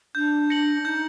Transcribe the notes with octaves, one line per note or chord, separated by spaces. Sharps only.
D4 G6
A#6 C#7 F#7
D#4 G6